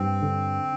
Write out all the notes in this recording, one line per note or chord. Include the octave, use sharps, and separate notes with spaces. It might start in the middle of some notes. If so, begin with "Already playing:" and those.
Already playing: G2 C4
D3